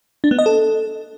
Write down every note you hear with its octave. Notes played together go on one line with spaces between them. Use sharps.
D4
B3
D#5
A4